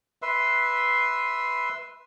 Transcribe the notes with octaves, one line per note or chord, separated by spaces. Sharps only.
B4 E5 C6